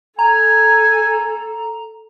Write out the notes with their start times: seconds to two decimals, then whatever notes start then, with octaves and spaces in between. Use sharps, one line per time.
0.19 A4 G#5 A#5